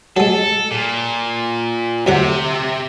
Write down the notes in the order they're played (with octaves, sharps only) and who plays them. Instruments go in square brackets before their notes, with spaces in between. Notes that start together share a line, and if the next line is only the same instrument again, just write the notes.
[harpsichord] F#3 G#3 [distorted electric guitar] A4
[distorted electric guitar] A#2
[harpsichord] D2 F#3 F#5 [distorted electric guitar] C3